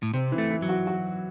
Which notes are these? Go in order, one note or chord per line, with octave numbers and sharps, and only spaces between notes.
A2
C3 C4
E3
A3
E3
F#3
F#4
F#4